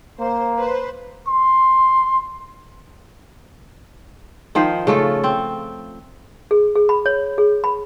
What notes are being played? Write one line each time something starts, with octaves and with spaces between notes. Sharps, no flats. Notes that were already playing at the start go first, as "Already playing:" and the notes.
A#3 C5
B4 C5
C6
D#3 F3 C5
C#3 A3 F4 A4
C4
G#4
G#4
B5
C#5
G#4
B5